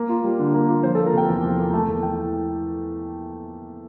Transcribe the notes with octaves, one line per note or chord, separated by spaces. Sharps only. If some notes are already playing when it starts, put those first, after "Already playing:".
Already playing: A#3
F4
G3
D3
A#3
F4
F3 C5
A#3 A4
A#4
C3 G5
E2
F3
A#3
A3 A5
E2
E3 G5